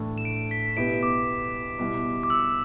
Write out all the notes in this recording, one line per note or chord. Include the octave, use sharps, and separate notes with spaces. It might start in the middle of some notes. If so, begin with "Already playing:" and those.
Already playing: A2 E3 A3 D4
E7
D7
B6
B2 B3 E4 G4 D7
D6
B2 G3 E4
D6
E6